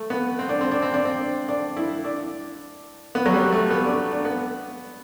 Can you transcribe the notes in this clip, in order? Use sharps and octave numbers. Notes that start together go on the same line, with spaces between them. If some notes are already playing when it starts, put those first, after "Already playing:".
Already playing: A3
B3
C4
D4
C4
D4
C4
D4
C4
D4
E4
D4
B3
F#3
G3
A3
B3
D4
D4
B3